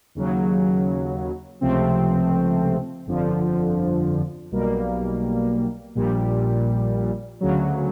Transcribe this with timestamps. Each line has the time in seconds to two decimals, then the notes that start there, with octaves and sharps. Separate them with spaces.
0.15 D#2 C#3 F#3
1.61 C#2 C3 F3 A3 C4
3.06 G1 F2 D3 F3
4.51 B1 B2 G3 A#3
5.95 A#1 A#2 G3
7.41 D2 C#3 F#3